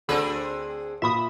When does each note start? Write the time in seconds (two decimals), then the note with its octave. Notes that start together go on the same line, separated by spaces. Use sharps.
0.09 D2 D3 C4 D4 G#4 B5
1.02 A#2 E5 B5 D#6